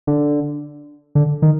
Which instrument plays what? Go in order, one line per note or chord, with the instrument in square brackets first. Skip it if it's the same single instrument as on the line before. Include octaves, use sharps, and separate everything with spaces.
[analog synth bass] D3
D3
D#3